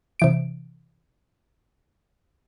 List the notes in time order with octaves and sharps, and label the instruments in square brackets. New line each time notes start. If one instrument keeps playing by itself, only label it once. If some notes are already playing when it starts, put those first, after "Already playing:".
[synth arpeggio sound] C3 E3 D7